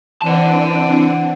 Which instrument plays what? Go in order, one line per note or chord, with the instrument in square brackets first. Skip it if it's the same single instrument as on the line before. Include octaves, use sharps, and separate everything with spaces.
[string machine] E3 C4 D4 [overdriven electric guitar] F#5 A5